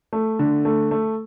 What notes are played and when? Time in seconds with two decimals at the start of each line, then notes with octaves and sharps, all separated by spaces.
0.13 A3
0.39 D3
0.65 A3
0.91 A3